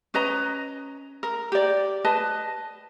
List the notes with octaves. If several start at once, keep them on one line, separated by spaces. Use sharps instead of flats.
C#4 B4 D#5 A#5
A#4
G4 D5
B4 D#5 A5